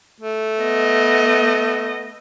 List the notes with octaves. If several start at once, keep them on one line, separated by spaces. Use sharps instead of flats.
A3
B3 D#5